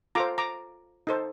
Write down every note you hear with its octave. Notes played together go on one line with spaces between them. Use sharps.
F4 A4 C5 A#5 D6
A#5 D6
D#4 A4 C5